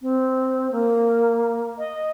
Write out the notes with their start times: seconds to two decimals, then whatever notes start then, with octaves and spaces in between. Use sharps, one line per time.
0.02 C4
0.71 A#3
1.78 D#5